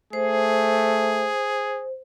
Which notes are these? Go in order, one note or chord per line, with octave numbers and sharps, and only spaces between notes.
A3 G#4 C5